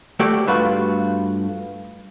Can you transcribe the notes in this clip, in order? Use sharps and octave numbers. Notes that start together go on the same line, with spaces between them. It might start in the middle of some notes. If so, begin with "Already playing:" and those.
A3 F#4 G4 A4 D5
G2 A3 F4 F#4 B4